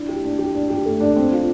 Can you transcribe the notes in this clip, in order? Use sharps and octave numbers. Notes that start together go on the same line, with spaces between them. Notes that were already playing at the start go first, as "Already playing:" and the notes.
Already playing: D4 E4
G4
D4
G4
D4
G4
A3
D4
C4
F4